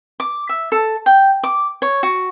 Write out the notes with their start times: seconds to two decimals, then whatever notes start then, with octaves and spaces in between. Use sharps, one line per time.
0.20 D6
0.49 E5
0.72 A4
1.06 G5
1.43 D6
1.82 C#5
2.03 F#4